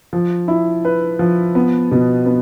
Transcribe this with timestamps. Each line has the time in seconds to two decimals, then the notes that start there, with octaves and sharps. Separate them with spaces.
0.13 F3
0.48 E4
0.85 B4
1.19 F3
1.55 B3
1.91 B2
2.26 B3